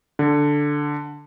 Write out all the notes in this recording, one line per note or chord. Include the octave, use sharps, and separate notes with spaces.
D3